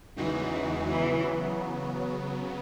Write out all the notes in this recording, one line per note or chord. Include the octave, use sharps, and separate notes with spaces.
E2 C#3 E3 G#3 D#4 F#4
C#3 E3 F#3 B3